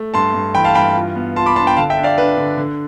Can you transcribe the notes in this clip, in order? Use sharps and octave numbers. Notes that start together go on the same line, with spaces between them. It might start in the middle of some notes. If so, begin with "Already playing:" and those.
Already playing: A3
G2 A5 C6
G2
E3 G5 B5
F5 A5
G2 G5 B5
F4
B3
F4 A5 C6
B5 D6
D4 A5 C6
G5 B5
D3 F5 A5
E5 G5
D4
D5 F5
D4 B4
D3
D3